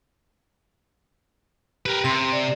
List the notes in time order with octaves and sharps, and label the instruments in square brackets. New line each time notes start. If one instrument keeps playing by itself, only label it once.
[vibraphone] G4 G5 [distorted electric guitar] A#4 B4
[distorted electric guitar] C3 [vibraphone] C6
[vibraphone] D5